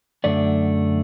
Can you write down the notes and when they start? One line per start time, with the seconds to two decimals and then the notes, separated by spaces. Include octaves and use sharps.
0.24 F#2 D3 A3 D5